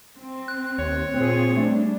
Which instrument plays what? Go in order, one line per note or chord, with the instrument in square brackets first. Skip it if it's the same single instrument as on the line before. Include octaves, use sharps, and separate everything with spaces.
[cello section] C4
[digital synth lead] F#6
[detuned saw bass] D#2 [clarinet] C#5
[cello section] A#2 F4 G#4 [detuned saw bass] C4
[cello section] G3 D4 [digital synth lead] A3